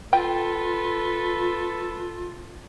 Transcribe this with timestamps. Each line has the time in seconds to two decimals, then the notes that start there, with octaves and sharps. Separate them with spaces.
0.13 F4 A4 B4 G5